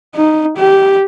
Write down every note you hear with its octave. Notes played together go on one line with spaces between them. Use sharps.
D#4
G4